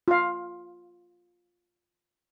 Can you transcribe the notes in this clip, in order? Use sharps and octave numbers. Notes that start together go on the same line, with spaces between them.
F4 F5